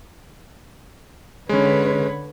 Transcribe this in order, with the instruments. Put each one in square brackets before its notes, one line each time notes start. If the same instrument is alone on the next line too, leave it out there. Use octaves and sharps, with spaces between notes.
[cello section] D3 B4 C#5 [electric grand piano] G#3 C#4